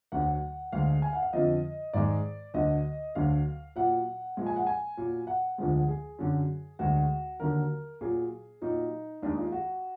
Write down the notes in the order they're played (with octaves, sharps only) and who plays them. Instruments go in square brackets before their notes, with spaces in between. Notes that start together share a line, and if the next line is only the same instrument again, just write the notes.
[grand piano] D2 D3 F#3 F#5
D2 D3 G#3 F5
G#5
F#5
F5
F2 D3 F3 D#5
G#2 D#3 G#3 D5
D2 D3 F#3 D#5
D2 D3 F#3 F5
A#2 F#3 F#5
A#2 F3 G#3
G#5
F#5
G#5
A#2 F#3
F#5
D2 D3 F3 G#3
G#4
F#2 D3 F#3
D2 D3 G#3 F#4
D#2 D3 F#3 A#4
A#2 F#3 G#4
A#2 F#3 D#4
D#2 D#3 G#3 D4
F4
F#4